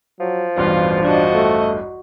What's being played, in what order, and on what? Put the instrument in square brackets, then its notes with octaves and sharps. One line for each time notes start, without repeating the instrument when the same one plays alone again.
[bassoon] F3 [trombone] F#3
[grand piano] A1 E2 G2 [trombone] B2 [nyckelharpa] F4
[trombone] D4 [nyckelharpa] F#4 D#5
[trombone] A3